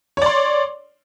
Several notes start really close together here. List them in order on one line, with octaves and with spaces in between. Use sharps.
C#5 D5 C6